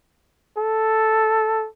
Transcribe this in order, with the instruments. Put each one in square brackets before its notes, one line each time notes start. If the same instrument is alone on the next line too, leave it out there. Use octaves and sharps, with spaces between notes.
[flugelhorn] A4